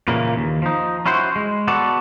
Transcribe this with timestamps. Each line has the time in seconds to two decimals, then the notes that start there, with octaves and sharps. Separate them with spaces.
0.08 A#2 C#3 E3 A#3
0.36 D#2
0.62 F3 D#4
1.06 C#4 E4 F#4 C5
1.36 G#3
1.68 B3 F#4 A4 D5